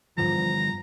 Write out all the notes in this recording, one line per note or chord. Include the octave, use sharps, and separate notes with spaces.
G2 D3 E3 F3 A#5